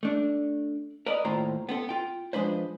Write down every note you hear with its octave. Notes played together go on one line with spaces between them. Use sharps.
A3 D4
A#4 B4 D5 D#5 B5
D#2 A2 F4 C5 A#5
B3 C4 A4
F4 G5
F3 G#3 D4 B4 C5